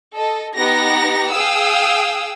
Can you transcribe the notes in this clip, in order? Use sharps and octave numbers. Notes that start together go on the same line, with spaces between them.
A4 D#5
B3 D#4 G4 F#5 A#5 A#6
G#4 F5 G5 D#6 E6